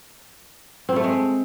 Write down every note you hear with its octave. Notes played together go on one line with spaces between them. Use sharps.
C4
A3
G#3